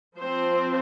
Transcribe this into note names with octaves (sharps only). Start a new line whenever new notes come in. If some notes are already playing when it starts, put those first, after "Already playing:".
F3 C4 C5